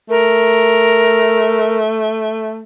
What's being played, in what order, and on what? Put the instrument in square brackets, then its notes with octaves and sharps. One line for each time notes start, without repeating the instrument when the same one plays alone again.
[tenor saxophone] A3 [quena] A#4